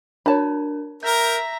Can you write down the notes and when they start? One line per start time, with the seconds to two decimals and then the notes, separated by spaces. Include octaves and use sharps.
0.26 D4 A#4 C#5 A5 B5
1.03 A#4 E5 A#5 G6